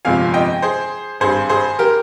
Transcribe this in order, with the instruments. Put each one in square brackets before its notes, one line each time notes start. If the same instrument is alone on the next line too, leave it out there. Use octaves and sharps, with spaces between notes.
[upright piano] G1 F2 C3 F3 G#3 F5 G#5
D#5 G5
G#4 C5
G#1 G2 G3 G#4 C5
G#4 C5
G4 A#4